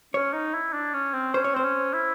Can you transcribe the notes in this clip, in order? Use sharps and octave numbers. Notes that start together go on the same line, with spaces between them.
C#4 C#5
D#4
E4
D4
C#4
C4
C#4 C5
C#5
C4 C5
C#4
E4